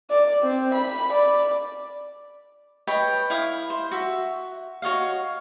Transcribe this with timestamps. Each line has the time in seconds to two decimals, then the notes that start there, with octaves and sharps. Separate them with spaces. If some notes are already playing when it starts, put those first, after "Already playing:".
0.10 D5
0.43 C4
0.74 B5
1.13 D5
2.87 B4 C#5 D#5 G5
3.30 E4 F5 D#6
3.70 C5
3.91 F#4 E5
4.82 F#4 C#5 D#5 F5